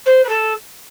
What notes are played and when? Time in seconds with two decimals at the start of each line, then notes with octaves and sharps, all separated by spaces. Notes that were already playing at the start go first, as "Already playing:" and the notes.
0.05 C5
0.24 B4
0.28 A4